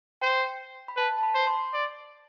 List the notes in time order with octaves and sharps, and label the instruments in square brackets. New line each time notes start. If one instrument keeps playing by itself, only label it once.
[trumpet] C5 [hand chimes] G5
[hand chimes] B5
[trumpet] B4 [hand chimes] A5
[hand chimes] A5
B5
[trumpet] C5
[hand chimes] C6
[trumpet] D5